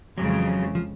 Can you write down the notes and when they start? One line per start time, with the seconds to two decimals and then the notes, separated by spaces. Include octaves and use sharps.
0.18 F2 C#3 E3 F#3 G#3
0.75 F3